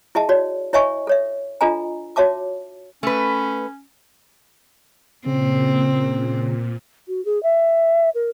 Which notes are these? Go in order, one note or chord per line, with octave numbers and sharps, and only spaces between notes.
E4 G#4 D#5 E5 A5
F#4 C#5 D5
E4 C#5 D#5 E5 G#5 C#6
A4 C#5 E5
D4 F4 A4 D#5 G#5 A#5
F#4 C#5 E5 A5 D6
A3 C#4 B4
A#2 C#3 C4
F#4
G#4
E5
A#4